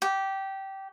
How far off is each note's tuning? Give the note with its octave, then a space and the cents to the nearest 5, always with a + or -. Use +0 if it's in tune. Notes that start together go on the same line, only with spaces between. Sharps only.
G4 -15